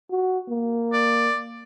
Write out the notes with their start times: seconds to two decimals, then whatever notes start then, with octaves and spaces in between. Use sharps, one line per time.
0.11 F#4
0.49 A#3
0.93 D5